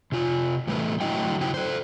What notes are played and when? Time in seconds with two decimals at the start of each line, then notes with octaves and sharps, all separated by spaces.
0.12 C3 F4
0.67 A2 E3 G3 A3 B4
1.00 D3 F#3 A3 E4 D#5 G5
1.41 C#3 E4 F#4 C5 G5
1.54 A4 C5